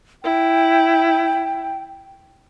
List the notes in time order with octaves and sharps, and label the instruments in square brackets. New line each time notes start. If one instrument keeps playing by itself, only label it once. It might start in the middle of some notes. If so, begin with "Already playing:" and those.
[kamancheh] E4 [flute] G5